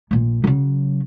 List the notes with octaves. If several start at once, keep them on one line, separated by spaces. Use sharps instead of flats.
A#1 A#2
C#3 F#3